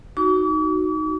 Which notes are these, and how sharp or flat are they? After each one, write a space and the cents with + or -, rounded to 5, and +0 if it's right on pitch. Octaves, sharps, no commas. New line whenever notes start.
D#4 +0 F#4 +0 D6 -45